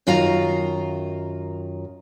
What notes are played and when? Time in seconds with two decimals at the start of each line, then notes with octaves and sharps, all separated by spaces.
0.07 F#2 D#3 F4 F#4 F5 A#5